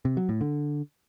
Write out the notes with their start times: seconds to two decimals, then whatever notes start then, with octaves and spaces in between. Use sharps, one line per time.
0.05 C3
0.17 F#3
0.29 A2
0.41 D3